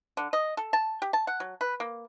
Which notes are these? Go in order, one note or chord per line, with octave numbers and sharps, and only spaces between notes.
D3
D#5
A4
A5
G4
A5
F#5
F#3
B4
A#3